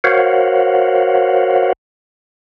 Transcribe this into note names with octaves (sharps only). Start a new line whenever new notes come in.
F#4 A#4 C5 C#5 F5 F#5